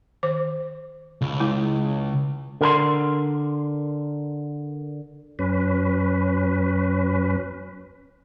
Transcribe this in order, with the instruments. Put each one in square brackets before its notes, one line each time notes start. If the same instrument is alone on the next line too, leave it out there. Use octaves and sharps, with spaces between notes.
[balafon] D#3 C5 D6
[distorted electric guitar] C#2
[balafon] G#3 E4
[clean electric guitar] D3 A#4 A#5 C6
[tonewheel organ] F#2 C#4 B4